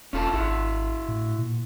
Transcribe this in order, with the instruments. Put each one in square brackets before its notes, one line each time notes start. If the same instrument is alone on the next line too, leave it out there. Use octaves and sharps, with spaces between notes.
[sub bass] E1 [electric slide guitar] C#4 F4 A4
[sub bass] G#1 [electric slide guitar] E4 F#4
[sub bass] A2
A#2